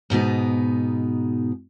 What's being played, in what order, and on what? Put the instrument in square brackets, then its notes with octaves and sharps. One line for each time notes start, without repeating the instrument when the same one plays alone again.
[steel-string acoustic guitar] G#2 B2 B3 D#4